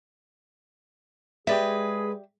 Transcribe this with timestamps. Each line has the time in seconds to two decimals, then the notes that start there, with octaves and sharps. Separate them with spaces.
1.47 G#3 G4 G#4 B4 D5 E5